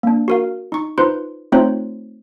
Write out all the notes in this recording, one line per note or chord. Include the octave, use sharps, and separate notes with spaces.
A#3 D4
F#4 A#4 F5
D#4 C#6
D#4 F4 B4 C5 C6
A3 C4 D#4 F4 C5 C#5